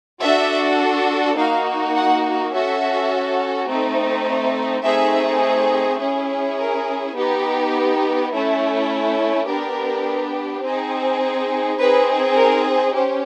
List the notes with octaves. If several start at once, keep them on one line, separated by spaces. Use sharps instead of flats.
D4 F#4 A4 E5
A#3 D#4 F#4 F5
F#5
C#4 F#4 A4 E5
A3 C4 D#4
A3 C4 D#4 G#4 E5
C#4 E4 G#4
A#4
B3 D#4 G4
A3 C#4 E4
B3 D4 G4 A#4
C4 D#4 G#4
C4 D#4 G#4 B4
A#4
C#4 G4 C5